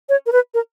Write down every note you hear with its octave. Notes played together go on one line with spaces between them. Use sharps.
C#5
A#4
B4
A#4